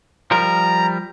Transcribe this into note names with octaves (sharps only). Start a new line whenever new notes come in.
F3 G3 A#4 A#5